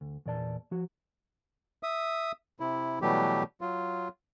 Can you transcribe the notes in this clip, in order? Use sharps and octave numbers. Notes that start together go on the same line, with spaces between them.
D2
E2 A#2 D5 A5
F3 F#4
E5 D#6
C3 E4
B2 E3 F#3 G3 A3 G4
F#3 F4